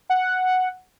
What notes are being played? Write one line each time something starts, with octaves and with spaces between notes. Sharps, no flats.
F#5